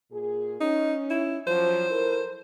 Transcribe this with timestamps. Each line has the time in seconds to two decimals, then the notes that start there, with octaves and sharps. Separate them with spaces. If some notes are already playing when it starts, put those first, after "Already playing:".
0.11 A#2 G#4
0.61 C#4 D#4
1.10 E4
1.47 F3 F#3 C5
1.90 E4 A4 A#4